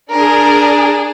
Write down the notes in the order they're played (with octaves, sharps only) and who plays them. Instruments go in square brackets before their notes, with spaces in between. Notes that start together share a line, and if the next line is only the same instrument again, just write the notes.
[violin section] D4 G#4 A#4